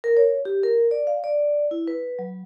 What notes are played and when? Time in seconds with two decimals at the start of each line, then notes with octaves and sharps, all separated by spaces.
0.04 A#4
0.17 C#5
0.45 G4
0.63 A#4
0.91 D5
1.07 F5
1.24 D5
1.71 E4
1.88 B4
2.19 F#3